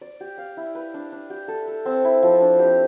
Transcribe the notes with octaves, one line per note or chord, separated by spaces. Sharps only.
D5
G4
F5
E4
B4
D4
D4
G4
A4
A4
C4
E4
F3
D4
G4